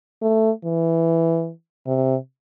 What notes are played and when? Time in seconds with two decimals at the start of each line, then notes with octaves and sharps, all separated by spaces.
0.22 A3
0.64 E3
1.87 C3